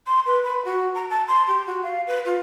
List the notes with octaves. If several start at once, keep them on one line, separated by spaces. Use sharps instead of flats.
C6
B4
B5
F#4
A#5
A5
C6
G4
F#4
F5
B4
F4